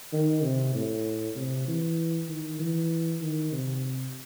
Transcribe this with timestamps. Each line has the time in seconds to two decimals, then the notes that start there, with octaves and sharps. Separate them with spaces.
0.13 D#3
0.43 C3
0.75 A2
1.36 C3
1.68 E3
2.29 D#3
2.60 E3
3.21 D#3
3.52 C3